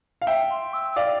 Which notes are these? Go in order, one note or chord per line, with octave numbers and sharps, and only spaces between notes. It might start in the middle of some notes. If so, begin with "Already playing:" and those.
F5
E5 G5
C6
E6
D5 F5 D6